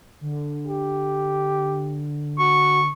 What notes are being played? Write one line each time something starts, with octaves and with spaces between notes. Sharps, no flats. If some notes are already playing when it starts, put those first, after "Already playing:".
D3
G4
F#4 C#6